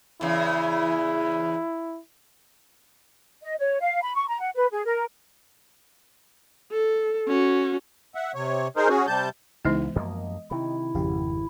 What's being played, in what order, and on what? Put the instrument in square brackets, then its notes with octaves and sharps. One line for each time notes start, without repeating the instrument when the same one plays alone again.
[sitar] E2 C#3 [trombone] E4
[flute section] D#5
C#5
F5
B5
C#6
A#5
F#5
B4
G#4
A#4
[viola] A4
C#4 F#4
[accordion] E5 F#5
C3 C#5
D#4 G#4 A#4 C5
C#4 F#4 G#4
C3 G3 A5 G6
[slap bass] C#2 [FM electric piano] C#3 D#4 E4 [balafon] E3 G#3 B3
[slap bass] F#2 F3 A#3 [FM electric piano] D#5
[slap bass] C3 D#3 [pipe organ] E4
[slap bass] G#1 [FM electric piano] F2 C#3 G4